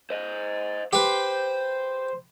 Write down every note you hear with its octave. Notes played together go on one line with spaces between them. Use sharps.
C5 D#5
G4 B4 C5